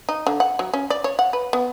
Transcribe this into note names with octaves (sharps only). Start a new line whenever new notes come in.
D#4
D3
F#5
F#3
C#4
D5
C#5
F#5
B4
B3